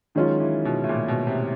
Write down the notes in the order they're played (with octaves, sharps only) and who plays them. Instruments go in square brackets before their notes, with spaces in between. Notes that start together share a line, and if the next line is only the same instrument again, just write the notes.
[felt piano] D#3 G#3 C#4 F4 [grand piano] F#3
[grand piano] E3
B2
A2
A#2
B2
C3